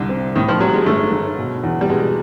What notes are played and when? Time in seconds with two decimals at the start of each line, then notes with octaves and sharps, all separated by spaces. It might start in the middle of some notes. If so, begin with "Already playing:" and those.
Already playing: C2 D3
0.09 C4
0.35 A2 D#3
0.48 F3
0.61 F#3 G3
0.74 G#3
0.86 G1 A3
1.12 G1
1.38 B2
1.63 E2
1.81 G3
1.89 B2 G#3